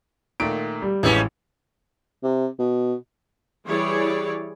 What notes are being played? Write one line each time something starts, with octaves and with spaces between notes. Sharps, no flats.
A#2 D#3 A3 D7
G3
A1 F2 E3 G3 G#3 C#4
C3
B2
E3 G3 E4 G#4 C#5 D5